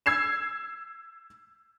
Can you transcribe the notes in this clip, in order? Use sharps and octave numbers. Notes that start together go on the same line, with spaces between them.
E6 G#6 C7 E7